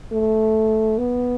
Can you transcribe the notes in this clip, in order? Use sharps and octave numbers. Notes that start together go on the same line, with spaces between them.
A3
B3